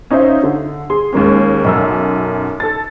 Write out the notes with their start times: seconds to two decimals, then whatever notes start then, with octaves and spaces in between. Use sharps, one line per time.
0.11 C#4 D#4 C5 E5 F5
0.43 D3
0.90 G#4 C6
1.13 D#2 G#3 A#3 C#4
1.64 B1 F#2 E6
2.60 A4 A6